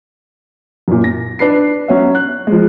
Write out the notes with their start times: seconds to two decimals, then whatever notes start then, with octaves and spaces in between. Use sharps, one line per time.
0.88 F#2 A#2
1.04 A#6
1.39 D4 B4 C7
1.88 F#3 C#4 E5
2.15 F#6
2.47 F3 G#3